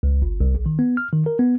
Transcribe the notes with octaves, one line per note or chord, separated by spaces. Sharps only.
C#2
G1
C2
A#1
D#3
B3
F6
D#3
A#4
B3